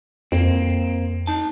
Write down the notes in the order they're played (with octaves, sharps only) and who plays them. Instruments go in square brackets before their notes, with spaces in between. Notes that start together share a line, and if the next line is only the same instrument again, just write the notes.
[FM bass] F2 [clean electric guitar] A#3 C4
[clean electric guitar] D#4 A5